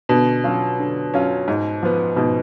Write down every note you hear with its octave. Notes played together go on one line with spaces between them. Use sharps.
B2 D3
F#3 C#4 F4
D3
F#3 C#4 F4
G#2
F3 B3
G#2 B2